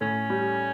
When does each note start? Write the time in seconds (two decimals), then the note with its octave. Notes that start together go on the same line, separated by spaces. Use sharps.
0.01 A2 C#4
0.30 G3